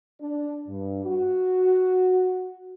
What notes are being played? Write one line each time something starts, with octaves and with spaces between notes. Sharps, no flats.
D4
G2
F#4